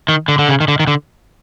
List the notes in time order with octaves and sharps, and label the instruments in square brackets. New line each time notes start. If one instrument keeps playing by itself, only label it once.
[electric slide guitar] D#3
D3
D3
C#3
D#3
D3
D#3
D3